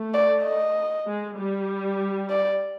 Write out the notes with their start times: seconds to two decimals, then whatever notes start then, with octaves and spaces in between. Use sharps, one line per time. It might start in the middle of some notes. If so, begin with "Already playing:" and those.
Already playing: A3
0.14 D5
0.44 D#5
1.06 G#3
1.37 G3
2.30 D5